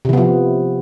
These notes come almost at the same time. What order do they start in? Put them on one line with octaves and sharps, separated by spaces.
C3 E3 B3 F3